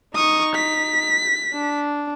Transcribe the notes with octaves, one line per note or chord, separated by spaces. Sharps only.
D#4 C#6 D#6
B6
D4